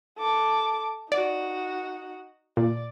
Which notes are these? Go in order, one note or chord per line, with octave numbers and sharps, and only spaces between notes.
A4 D6
D#4 F#4 D5
A#2 D5